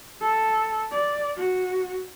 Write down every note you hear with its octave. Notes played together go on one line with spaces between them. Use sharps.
A4
D5
F#4